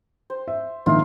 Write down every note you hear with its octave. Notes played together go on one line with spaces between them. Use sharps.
C5
E5
A#1 D#3 F4 E5 F5